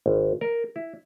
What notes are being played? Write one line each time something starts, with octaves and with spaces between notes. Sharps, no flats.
G#1
A#4
E4